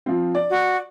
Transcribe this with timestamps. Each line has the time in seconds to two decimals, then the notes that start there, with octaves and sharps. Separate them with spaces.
0.06 F3 C4
0.35 D5
0.50 F#4